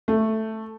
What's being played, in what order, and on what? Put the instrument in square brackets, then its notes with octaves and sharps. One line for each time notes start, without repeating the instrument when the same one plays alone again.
[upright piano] A3